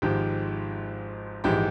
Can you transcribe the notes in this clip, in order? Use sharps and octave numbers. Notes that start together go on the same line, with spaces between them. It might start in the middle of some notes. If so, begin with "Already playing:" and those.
G#1 G#2 F3 G4
A#1 G#2 E3 G#3 G4